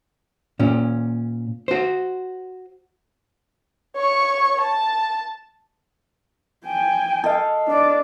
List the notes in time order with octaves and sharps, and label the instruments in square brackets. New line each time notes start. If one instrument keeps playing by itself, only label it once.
[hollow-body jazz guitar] A#2 C#4
F#4 C5
[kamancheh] C#5 C#6
A5
[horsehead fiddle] G5 G#5
[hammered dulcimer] A4 D#5 F5
[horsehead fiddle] D4 D5